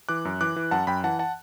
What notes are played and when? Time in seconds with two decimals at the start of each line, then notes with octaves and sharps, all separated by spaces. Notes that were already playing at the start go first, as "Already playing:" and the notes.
0.09 E3 D6 F#6
0.25 F#2
0.41 E3 D6 F#6
0.56 E3
0.71 F#2 F#5 A5
0.87 F#2 G5 B5
1.04 E3 F#5 A5
1.19 F#5 A5